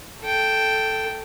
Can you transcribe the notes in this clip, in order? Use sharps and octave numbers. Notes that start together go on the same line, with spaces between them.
A4 G5